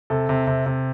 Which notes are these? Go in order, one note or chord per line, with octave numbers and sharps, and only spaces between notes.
C3 A4
C3
C3
C3